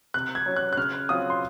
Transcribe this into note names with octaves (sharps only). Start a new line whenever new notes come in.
C3 F#6
G#6
F#3 C#4
F#6
F#6
C#3 F6
F#3 C4 F4 D#6
C6